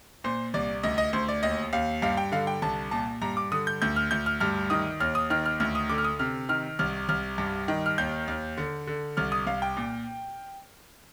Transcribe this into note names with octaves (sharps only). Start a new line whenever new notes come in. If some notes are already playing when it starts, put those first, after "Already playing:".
A#2 C5
C2 D5
D2 D#5
D#5
D2 C5
D5
D#2 D#5
D#2 F5
G2 F5
G5
D3 F5
G5
C2 A5
A#2 A5
G2 A#5
D6
D3 D#6
G6
D2 G6
F6
D2 G6
F6
G2 F6
D#3 D#6
D#2 F6
D#6
D#3 F6
F6
D2 F6
D#6
D3 D6
F6
D#6
C3 F6
D#3 F6
C2 F6
C2 F6
G2
D#3
F6
D#2 G6
D#2
D3
D3
C2 F6
D#6
C2 F5
G5
A#2